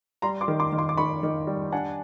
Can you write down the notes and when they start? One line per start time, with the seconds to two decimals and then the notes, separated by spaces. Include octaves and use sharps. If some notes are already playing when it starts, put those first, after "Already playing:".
0.22 G3 A#5 C6
0.41 C6 D6
0.48 D#3
0.60 C6 D6
0.72 D#3
0.78 C6 D6
0.89 D6
0.98 D#3 B5 C#6
1.23 D#3
1.47 G3
1.72 D4 F#5 G#5